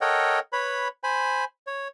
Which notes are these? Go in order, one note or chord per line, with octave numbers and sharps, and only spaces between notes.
A4 A#4 C#5 D#5 F#5 G5
B4 C#5 B5
C5 G#5 B5
C#5